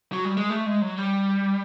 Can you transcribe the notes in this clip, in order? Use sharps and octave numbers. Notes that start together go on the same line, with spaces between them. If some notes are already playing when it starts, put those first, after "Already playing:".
F#3
G3
G#3
A3
G#3
F#3
G3